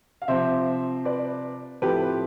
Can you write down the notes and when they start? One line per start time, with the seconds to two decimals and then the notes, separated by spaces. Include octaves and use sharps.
0.22 F5
0.28 C3 F3 C4 C5 E5
1.05 B4 D5
1.82 A2 F3 A3 C4 G4 B4